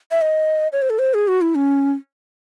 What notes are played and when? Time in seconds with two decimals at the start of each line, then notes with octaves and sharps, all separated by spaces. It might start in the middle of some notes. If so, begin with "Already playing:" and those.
0.11 E5
0.21 D#5
0.73 C#5
0.82 C5
0.90 A4
0.99 C5
1.14 G#4
1.28 F#4
1.41 E4
1.55 C#4